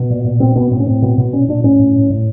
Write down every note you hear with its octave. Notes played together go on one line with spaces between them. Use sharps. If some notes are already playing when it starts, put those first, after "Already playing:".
Already playing: B2
A#2
A#2
B2 C4
B2 B3
A2 C4
C#4
A2 C4
B2
B2
A#2 C#4
A#2 D4
A2 C#4
A2
A2
A2